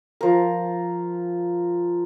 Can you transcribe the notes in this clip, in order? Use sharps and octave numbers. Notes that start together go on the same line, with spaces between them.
F3 A#4